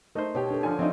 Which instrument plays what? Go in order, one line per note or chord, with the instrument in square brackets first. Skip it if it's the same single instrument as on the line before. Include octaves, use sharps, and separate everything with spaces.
[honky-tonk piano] A3 [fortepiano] D#4 C5 [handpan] A#4
[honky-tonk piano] B2 G4 [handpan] C#5
[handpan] D4 A4
[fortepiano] D3 F3 [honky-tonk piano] G#5
[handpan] F3 E5 F5 [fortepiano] C4 D4 D#4